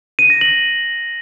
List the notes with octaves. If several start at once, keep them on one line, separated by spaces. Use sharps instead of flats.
D#7
A#6
F#7